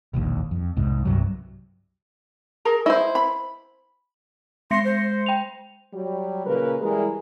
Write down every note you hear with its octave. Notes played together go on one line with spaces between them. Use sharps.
E1 A#1 D#2
F2
C2 G#2
C2 G2 C3 F#3
G#4 A#4 A#5
E4 C5 D#5
B5
G#3 C6 A#6 C#7
C5
G5 F7
F#3 G3
A#2 C#3 A#4 B4
E3 G3 G#3 E4 G#4 A#4